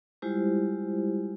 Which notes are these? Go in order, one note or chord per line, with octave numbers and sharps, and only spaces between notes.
G3 G#3 E4 F4 G4 C5